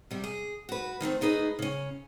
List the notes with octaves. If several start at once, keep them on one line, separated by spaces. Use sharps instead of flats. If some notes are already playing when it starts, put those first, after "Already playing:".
C3 G3
G#4
F#4 B4
D#3 G3 A3 C4
A3 D#4 G#4 B4 D#5
C#3 C#4